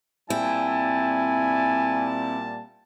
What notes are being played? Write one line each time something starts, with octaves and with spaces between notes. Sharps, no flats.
A#2 G3 C4 E4 G#5 A5